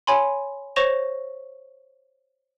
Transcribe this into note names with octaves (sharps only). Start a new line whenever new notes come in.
C#5 G#5 B5 C6
C5 C#5 C#6 A#6 E7 F7